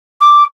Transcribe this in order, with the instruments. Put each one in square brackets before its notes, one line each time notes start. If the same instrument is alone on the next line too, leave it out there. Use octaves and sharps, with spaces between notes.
[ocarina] D6